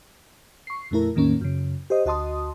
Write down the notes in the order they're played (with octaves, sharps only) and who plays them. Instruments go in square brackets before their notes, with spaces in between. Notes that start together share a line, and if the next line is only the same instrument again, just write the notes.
[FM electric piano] C#6 C7
F2 A#2 A3 E4 A#4
E2 A2 D#3 A#3 C#4
F#2 C#3
G4 C5 D#5
D2 F#4 D#5 A5 C6 D#6